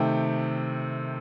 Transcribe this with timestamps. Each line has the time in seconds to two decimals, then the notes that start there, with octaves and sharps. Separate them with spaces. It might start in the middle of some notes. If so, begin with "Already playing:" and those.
Already playing: C3 D#3 A3 G5